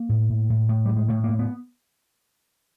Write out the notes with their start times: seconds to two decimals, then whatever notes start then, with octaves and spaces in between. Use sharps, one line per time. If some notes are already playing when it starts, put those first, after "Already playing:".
Already playing: A#3
0.09 A2
0.30 A2
0.50 A2
0.69 A2
0.85 A2 G3
0.96 G#3
1.08 A2 A3
1.24 A2 A#3
1.39 B3